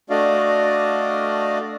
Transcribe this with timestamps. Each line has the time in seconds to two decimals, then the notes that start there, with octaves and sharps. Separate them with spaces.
0.10 A3 D4 F#4 D5 D#5 F5